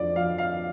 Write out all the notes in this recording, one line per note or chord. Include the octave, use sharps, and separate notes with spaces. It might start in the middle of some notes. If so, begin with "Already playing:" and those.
Already playing: F2 D3 F3 D5
F3 F5
F5